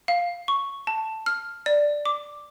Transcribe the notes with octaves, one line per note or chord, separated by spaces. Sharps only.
F5
C#6
A5
F6
D5
D6